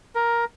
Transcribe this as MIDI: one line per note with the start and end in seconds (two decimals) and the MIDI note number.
0.15 0.45 70